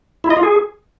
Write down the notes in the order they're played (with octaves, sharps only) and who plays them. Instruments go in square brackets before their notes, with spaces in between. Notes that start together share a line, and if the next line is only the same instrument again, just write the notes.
[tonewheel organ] E4
D#5
F4
G#4